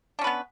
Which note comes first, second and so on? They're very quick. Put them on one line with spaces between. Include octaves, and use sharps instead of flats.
D4 C#4 B4 B3